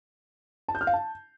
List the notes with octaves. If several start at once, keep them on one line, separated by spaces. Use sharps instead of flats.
A5
G6
F6
F5
A5